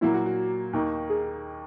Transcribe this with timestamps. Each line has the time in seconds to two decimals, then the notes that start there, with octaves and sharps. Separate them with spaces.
0.01 A#2 F#3 A#3 E4
0.14 F#4
0.26 F#4
0.73 D#2 D#3 A#3 D#4
1.10 G#4